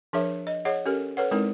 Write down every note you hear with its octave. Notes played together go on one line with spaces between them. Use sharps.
F3 D4 G#4 A#4 C#5 E5
D#5
G#4 C#5 D#5 F#5
C#4 G4 A4 A#4
A4 B4 C#5 F#5
G#3 C4 D#4 E4 A#4